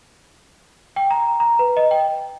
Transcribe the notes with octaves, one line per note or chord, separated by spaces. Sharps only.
G5
A#5
A#5
B4
D#5
G5